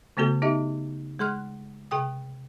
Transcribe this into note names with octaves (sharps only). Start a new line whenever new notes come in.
C#3 A3 B3 F#4 A4
B3 D#4 G4 D#5 E5
G#3 G#4 C6 F6 F#6
C3 G#4 G5 D#6